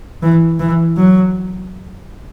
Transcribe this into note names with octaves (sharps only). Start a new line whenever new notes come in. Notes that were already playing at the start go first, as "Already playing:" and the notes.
E3
E3
F#3